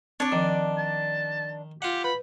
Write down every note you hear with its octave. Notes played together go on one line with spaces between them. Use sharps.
C4 D4 C#5 D5
D#3 F3
A5
F4 G4 F#5
B4 B5